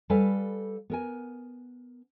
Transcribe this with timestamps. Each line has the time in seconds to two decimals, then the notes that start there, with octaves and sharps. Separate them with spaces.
0.10 G3 A4 B4 F5 G#5
0.90 B3 A#4 G#5